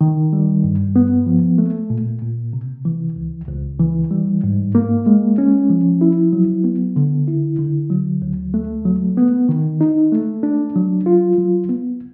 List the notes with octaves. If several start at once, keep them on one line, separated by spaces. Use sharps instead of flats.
D#3
G3
G2
B3
F3
A3
A#2
A#2
C3
E3
C#2
C#2
E3
G3
G#2
A#3
G#3
C#4
F3
E4
F#3
B3
D3
E4
D3
F#3
D2
A3
F#3
B3
D#3
D#4
A3
D4
F#3
F4
F#3
B3